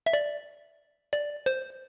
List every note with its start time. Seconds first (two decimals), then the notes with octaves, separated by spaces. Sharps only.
0.06 E5
0.13 D5
1.13 D5
1.46 C5